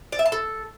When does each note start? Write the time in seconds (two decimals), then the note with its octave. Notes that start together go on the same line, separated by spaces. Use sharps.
0.12 D5
0.19 E5
0.26 A5
0.32 A4